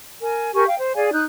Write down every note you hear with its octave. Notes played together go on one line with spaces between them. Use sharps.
A#4 G#5
G4 A#4 G#5 C#6
F5 G5
C5
G#4 D5 F5 G#5
D#4 F#6 G6